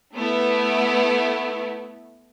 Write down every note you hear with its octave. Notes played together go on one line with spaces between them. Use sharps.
A3 B3 E4